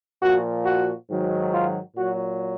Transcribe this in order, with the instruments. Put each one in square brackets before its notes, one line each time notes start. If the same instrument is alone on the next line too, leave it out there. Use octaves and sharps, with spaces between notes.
[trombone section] A#2 F3 F#4
F#4
G#2 D#3 F#3
F4
A#2 F#3 F#4